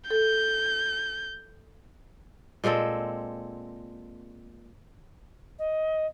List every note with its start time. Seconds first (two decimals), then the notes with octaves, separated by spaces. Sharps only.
0.10 A4 G6
2.64 A#2 G#3 C4 A4
5.58 D#5